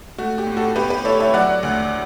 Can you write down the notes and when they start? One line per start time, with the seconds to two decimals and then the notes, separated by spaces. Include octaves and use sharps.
0.18 A3 F#4
0.38 G4
0.47 A2
0.57 F#4 A4
0.76 B3 G4 B4
0.90 G4 B4
1.05 E4 A4 C#5
1.20 C#5 E5
1.34 F#3 D5 F#5
1.63 D2